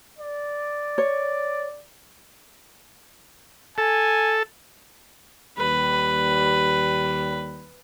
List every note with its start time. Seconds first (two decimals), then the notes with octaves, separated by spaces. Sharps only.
0.19 D5
0.98 C#5
3.78 A4 G#5
5.58 D#2 G3 B4